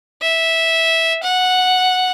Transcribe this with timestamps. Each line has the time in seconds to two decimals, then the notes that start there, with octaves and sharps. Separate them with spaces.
0.22 E5
1.23 F#5